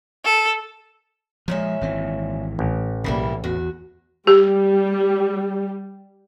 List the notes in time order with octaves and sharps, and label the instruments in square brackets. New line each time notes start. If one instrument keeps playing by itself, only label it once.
[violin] A4
[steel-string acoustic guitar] A#2 C#4 E5 [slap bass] F3 G#3
[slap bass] G#1 E3 C4
[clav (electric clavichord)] A1
[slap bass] B1 C#3 [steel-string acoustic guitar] G3 A#3 E4
[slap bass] E2 [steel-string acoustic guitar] F#4
[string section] G3 [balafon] G4